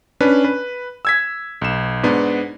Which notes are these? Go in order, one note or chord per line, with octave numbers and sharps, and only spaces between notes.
C#4 D4 B4
B4
E6 G#6 B6
B1 E7
G#2 B3 D4